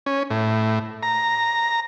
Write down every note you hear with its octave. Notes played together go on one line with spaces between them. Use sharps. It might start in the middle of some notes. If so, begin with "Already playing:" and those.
C#4
A2
A#5